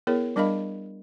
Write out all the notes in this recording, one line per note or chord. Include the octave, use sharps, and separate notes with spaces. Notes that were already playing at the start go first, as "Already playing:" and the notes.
B3 E4 G#4 A#4 C#5
G3 D4 A#4 D#5 F5 B5